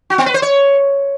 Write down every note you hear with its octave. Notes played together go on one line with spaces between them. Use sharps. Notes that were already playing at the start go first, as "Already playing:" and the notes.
F#4
B3
B4
C5
C#5